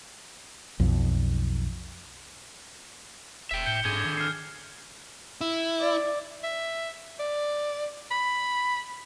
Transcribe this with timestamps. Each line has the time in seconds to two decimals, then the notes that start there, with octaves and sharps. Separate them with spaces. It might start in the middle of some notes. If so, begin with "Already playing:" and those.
0.80 B1 F2
3.51 E1 E5 G5
3.66 A2 G6 C#7 G7
3.85 G#2 D3 G#4 G#6
4.05 D#3
4.17 F6 C7
5.41 E4
5.80 D5
6.43 E5
7.19 D5
8.11 B5